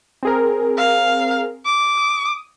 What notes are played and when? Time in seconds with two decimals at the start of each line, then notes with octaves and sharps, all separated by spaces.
0.23 C4 G#4 A#4
0.78 F5
1.66 D6
1.97 D#6